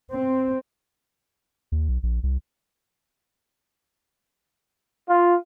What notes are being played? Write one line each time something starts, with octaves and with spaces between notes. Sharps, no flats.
C4
D#2
B1
A#1
C2
F4